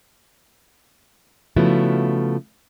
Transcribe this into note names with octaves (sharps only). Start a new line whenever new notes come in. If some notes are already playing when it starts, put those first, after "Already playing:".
C#3 F3 A3 B3 E4 F#4